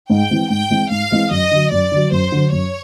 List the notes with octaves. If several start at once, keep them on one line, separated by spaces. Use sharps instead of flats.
G#2 G5
E3 G#3 C4
G#2 G5
E3 G#3 C4
G#2 F5
E3 G#3 C4
F#2 D#5
D3 F#3
F#2 D5
D3 F#3
F#2 C5
D3 F#3
F#2 C#5